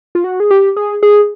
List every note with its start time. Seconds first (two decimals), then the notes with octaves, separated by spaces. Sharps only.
0.15 F4
0.24 F#4
0.40 G#4
0.51 G4
0.76 G#4
1.03 G#4